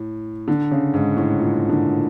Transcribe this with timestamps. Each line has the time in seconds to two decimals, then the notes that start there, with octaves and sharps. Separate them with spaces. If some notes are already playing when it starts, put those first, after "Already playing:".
Already playing: A2
0.48 D3
0.71 C#3
0.94 G#2
1.17 A2
1.40 A#2
1.69 D3